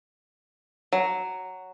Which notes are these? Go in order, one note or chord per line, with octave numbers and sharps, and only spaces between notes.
F#3